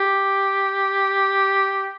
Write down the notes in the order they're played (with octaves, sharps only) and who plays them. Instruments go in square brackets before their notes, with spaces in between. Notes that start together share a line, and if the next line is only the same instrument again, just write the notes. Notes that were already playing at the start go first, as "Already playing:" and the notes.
Already playing: [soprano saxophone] G4